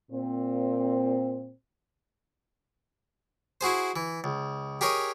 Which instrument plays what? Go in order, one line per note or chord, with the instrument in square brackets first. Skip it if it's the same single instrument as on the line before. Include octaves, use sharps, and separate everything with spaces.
[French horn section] A#2 C4
[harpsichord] E4 F#4 G#4 C5
E3
C#2
G4 G#4 A#4 C#5 D#5